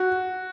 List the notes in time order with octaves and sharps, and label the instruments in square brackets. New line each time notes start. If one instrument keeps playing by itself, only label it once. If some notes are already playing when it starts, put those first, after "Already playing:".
Already playing: [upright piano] F#4